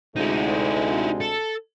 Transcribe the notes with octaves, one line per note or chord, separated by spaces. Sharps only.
D2 C3 G#3 D#4 E4
A4